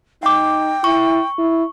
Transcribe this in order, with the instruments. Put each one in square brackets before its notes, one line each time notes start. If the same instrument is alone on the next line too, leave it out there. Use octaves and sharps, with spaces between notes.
[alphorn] D#4 [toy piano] F#5 D6 [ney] G5
[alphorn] E4 [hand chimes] C#6
[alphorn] E4